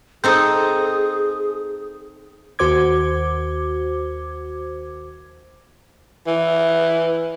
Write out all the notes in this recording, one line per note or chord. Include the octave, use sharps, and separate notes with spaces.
C4 D#4 G#4 A4 D#6 G6
D#2 F#4 C5 D6 G#6
E3